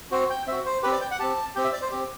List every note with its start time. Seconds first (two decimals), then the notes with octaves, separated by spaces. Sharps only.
0.11 C4 F#4 C5
0.30 G5
0.47 C4 F#4 E5
0.65 C5
0.83 G4 B4
0.86 C4
0.92 D5
1.01 G5
1.11 F#5
1.19 C4 G4 A5
1.55 C4 G4 G5
1.64 E5
1.73 D5
1.82 C5
1.91 C4 G4